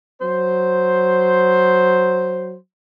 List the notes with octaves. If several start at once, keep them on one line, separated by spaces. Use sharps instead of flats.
F#3 C5